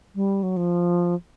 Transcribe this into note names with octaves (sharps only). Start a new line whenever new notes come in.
G3
F#3
F3